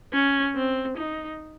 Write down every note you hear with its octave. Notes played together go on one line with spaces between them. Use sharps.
C#4
C4
D#4